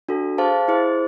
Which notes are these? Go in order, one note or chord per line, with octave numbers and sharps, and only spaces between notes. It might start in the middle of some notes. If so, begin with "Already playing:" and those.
D4 F#4 A4
G#4 C5 F5 A5
E4 G#4 C5